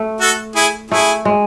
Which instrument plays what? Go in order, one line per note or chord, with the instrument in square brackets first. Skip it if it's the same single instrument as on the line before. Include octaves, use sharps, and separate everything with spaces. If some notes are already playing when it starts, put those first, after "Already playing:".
Already playing: [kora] A3
[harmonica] F#4 A4
E4 G#4
[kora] A3 [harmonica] E4 G#4
[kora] G#3